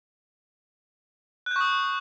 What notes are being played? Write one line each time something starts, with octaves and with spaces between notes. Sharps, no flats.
C#6 D#6 F#6 G6